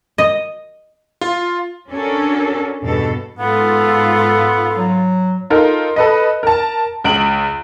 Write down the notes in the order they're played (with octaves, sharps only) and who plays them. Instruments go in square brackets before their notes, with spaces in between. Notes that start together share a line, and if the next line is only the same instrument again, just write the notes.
[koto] D#5
[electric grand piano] F4
[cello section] C#4 D4 F#4 A4 A#4
E2 G2 B2 A4
[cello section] G#2 F4 [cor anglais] B3 [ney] A4
[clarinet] F#3
[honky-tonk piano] D#4 F4 A4 A#4
A4 B4 D#5
A#4 A5
C#2 D7 F#7